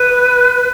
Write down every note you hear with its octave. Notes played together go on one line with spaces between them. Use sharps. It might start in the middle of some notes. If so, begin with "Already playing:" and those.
Already playing: B4